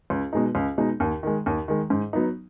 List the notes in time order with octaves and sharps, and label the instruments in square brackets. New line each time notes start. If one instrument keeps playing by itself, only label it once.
[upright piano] C#2
B2 G#3 D#4
C#2
B2 G#3 D#4
D#2
D#3 G#3
D#2
D#3 G#3
G#2
F#3 B3 D#4